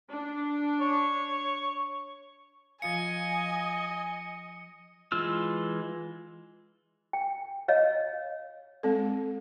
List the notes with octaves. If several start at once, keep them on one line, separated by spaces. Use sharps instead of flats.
D4
C#5
F3 F4 D#5 F5 G#5 C#7
E3 G#3 F4 E6 F6
G5
C#5 D#5 F5
G#3 C4 A4